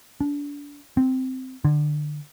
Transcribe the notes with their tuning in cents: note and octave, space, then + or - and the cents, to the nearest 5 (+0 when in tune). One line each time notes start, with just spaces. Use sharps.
D4 -30
C4 -10
D3 +25